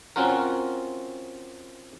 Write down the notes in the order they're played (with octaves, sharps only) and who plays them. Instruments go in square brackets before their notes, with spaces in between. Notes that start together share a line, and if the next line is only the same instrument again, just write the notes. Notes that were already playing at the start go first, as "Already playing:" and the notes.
[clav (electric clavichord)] C4 C#4 F4 F#4 A#4